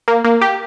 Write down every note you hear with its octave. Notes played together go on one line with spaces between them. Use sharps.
A#3
A#3
G4